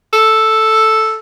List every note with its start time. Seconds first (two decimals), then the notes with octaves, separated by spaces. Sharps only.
0.13 A4